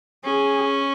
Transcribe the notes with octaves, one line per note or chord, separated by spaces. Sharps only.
C#4 G#4